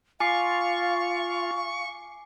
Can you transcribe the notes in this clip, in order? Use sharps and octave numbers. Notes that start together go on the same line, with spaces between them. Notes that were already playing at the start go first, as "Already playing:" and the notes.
F4 F5 G#5 C#6 D6 C7